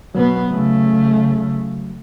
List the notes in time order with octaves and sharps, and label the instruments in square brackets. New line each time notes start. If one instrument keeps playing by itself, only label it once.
[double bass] B2 B3 [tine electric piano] F#3
[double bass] C#3 A3